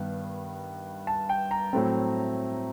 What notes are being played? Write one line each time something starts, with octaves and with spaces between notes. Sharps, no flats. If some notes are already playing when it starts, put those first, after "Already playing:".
Already playing: G2 D#3 B3
A5
G5
A#5
A2 F#3 A3 C4